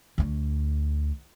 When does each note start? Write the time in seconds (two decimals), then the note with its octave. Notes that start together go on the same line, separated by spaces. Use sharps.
0.18 D2 D3